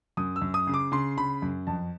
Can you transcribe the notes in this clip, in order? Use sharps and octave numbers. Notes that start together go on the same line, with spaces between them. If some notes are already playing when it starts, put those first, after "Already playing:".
F#2 D#6
E6
F#2
D#6
C#3
D6
C#3 C6
C#3 B5
F#2
F2 A5